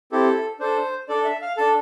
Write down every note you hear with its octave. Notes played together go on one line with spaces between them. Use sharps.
C4 E4 G4 A4
D4 A4 C5
D4 A4 D5
E5
F5
D4 A4 A5